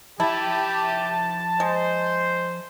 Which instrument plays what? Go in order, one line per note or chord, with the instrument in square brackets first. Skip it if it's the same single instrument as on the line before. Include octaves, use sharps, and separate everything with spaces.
[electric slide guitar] F3 E5 [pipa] E4 [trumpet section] G4 [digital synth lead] A5
[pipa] G#3 [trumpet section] C5